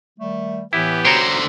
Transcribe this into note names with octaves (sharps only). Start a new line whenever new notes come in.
D#3 G3 A3
A2 E3 B3 E4 G4
D3 F#4 C5 C#5 G5 A#5